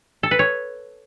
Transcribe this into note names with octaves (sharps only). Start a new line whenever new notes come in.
A4
B4
C#5